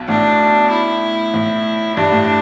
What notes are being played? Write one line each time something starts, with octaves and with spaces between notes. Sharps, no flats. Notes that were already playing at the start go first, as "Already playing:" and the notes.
Already playing: B1 B2
A2 D4
E4
A2
G2 D4
A2